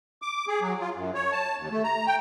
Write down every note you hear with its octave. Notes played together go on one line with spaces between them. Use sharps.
D6
G#4
F#3
F4
F#2
C#5
A5
D#2
A3
A#5
G5